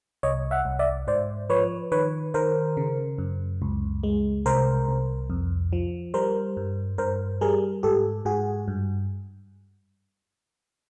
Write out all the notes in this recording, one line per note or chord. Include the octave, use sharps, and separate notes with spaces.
C2 C#5 D#5
E5 F#5
C2
D5 E5
G#2 C5 D5
F3 B4 C#5
D#3 B4 C#5
D#3 A#4 C5
C#3
F#2
C#2
G#3
C2 A#4 C5
C2
F2
F3
G3 A#4 C5
G2
G2 A#4 C5
G3 G#4 A#4
G#2 G4 A4
G#2 F#4 G#4
G2